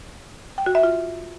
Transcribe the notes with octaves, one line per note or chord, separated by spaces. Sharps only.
G5
F#4
E5
F4